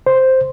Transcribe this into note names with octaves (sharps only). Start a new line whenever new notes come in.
C5